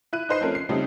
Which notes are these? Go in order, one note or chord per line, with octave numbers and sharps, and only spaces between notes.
E4 F#6 D#7
D#4 B4 C5 D#5 C7
F3 A3 C4 C#4 A4 A#4
C7
C#3 G3 A3 C4 C#4 D#4